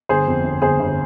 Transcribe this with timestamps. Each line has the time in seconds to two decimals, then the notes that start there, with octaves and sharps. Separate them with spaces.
0.09 G1 G#4 C5
0.28 F2
0.44 G1
0.62 G1 G#4 C5
0.80 G1